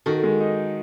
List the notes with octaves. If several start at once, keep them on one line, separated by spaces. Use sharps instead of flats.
D#3 F#4 A4
G#3
D#4